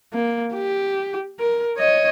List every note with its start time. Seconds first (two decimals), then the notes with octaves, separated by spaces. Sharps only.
0.14 A#3
0.54 G4
1.40 A#4
1.78 C#5 D#5